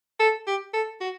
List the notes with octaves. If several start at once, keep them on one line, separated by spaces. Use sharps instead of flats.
A4
G4
A4
F#4